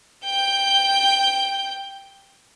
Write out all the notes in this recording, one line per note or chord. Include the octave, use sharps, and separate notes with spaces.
G5 G6